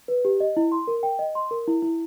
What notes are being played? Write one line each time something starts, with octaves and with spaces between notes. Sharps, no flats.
B4
G4
D#5
E4
C6
A#4
G5
D#5
C6
A#4
E4
E4